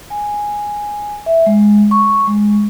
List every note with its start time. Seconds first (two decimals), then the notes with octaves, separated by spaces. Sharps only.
0.10 G#5
1.26 E5
1.46 G#3
1.91 C#6
2.27 G#3